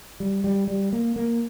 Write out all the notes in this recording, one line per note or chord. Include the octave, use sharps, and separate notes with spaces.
G3
G3
G3
A#3
A#3